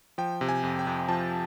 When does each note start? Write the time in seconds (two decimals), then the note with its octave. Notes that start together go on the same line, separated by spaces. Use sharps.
0.18 F3 G5
0.41 C3
0.49 G#5
0.63 F2
0.79 G5
0.87 F2
1.09 F3 A5